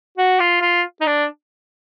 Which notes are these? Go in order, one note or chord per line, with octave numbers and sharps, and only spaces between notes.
F#4
F4
F4
D#4
D4